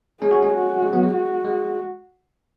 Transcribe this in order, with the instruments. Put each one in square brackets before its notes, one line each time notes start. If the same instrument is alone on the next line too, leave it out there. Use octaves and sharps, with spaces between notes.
[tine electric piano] G#3 C#4 [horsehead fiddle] G#4
[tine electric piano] C#4 F#4
G#3 C#4
[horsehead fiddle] F#4
[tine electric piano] G#3
F#3 B3
G#3
[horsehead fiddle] F#4
[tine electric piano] G#3